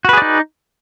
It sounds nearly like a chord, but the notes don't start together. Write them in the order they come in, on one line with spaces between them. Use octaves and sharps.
F#4 B4 G#4 D5 D#4